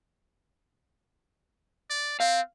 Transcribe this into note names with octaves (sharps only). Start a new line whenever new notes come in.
D5
C4 F5